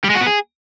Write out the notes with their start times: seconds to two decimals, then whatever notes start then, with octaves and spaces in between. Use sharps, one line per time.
0.04 G3
0.10 G#3
0.15 F#4
0.21 B3
0.26 G#4